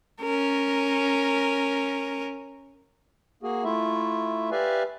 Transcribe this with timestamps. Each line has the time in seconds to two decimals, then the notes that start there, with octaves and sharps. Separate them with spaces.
0.21 C#4 A#4
3.43 A#3 F#4 G#4
3.64 A3 E4 F4 E5
4.51 G4 B4 D5 E5 F5 G#5